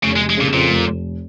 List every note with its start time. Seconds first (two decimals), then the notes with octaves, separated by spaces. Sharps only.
0.04 F1 C#3
0.16 G#3
0.21 F1
0.29 G#3
0.37 A#2 C#3
0.53 F2 A#2
0.70 F1
0.87 F1